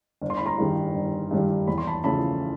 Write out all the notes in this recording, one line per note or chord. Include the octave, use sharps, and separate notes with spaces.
G1
C6
B5
A#5 C6
G2 D#3 G3
G1
G2 D#3 G3
E2 B5
C6
A5 B5
C#3 F3 A3 A5 B5